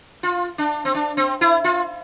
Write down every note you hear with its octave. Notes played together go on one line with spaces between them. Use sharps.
F4
D4
C4
D4
C4
E4
F4